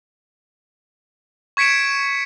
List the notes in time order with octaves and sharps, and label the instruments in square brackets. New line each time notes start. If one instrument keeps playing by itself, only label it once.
[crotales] C#6 G#6 B6 C#7 D7 E7